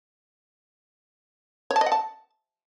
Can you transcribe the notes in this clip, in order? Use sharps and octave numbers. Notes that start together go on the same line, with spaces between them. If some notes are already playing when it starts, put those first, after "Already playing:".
C#5
A5
D#5
F#5
A5